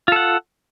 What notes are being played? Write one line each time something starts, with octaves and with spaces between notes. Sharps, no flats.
F4 A4 F#5